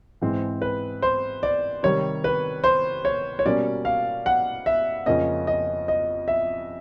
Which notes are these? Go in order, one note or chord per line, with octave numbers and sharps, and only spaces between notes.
G#2 E3 G#3 C4
B4
C5
D5
C3 D#3 G3 C#5
B4
C5
C#5
C#5
B2 G3 A#3 C#4 D5
F5
F#5
E5
F2 C#3 F3 A#3 C#4 D#5
D#5
D#5
E5